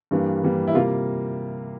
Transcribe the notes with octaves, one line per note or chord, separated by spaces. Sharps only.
G2 E3 G3 A#3
G2 E3 G3 A#3
E4
C3 G3 A#3 F4